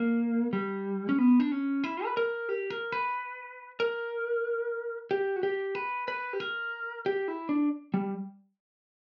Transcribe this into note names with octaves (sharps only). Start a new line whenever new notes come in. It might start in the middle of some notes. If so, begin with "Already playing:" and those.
Already playing: A#3
G3
C#4
B3
D4
C#4
E4
B4
A#4
G4
A#4
B4
A#4
G4
F#4
G4
B4
B4
G4
A#4
G4
E4
D4
G3